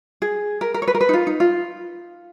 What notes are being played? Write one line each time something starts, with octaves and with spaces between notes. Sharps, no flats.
G#4
A#4
A#4
C#5
B4
A#4
B4
D#4
F4
D#4
F4